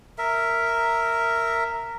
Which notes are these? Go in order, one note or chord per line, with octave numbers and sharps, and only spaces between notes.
A#4 E5